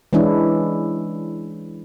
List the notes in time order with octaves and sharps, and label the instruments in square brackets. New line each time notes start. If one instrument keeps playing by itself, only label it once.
[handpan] E3 G#3 C#4 D4 E4